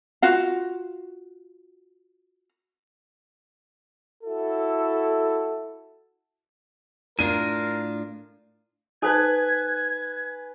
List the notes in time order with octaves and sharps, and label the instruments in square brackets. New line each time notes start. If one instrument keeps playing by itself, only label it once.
[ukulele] F4 F#4 F5
[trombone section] E4 F#4 A4
[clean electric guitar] A2 D4 F4 [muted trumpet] A#4 [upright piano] D#7
[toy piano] D#4 A4 C5 [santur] B4 G#5 [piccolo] G#6